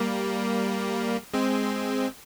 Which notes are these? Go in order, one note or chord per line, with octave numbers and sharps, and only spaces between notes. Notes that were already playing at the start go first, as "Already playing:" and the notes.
Already playing: G3 A#3
G#3 C4